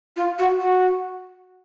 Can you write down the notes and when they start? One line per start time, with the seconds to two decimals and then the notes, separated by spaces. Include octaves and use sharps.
0.16 F4
0.38 F#4
0.60 F#4